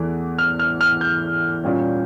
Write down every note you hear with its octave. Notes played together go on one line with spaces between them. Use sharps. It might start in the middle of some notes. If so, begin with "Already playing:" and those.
Already playing: E2 E3 A3
F6
F6
F6
G6
A#2 G3 C#4